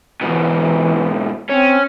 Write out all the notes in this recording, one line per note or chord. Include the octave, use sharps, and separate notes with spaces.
G#2 B2 E3
C4 C#4